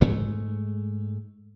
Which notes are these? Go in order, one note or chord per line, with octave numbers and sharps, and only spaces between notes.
G#2 G#3 A3